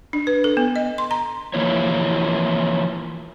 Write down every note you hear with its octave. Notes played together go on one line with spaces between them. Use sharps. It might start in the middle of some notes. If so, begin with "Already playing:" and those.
D4
B4
A4
B3
D#5
C6
A#5
E3 F3 A#3 E4 C#5